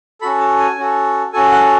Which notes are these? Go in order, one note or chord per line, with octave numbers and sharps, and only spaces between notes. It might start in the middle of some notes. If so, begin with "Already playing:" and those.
C#4 F#4 A4 B5
A5
G#5
C#4 F#4 A4
C#4 F#4 A4 G#5
F#5